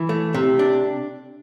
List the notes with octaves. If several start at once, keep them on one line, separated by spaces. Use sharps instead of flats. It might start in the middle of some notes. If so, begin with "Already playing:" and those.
Already playing: E3
A3
C3
D4